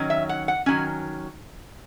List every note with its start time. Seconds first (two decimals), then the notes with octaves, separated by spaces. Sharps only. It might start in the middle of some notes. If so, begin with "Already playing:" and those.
Already playing: D#3 F#3 C#4
0.10 E5
0.29 F#5
0.48 F#5
0.66 D#3 F#3 C#4 G#5